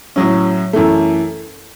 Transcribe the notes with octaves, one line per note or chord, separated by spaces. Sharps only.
A2 F#3 C#4
F#2 E3 A3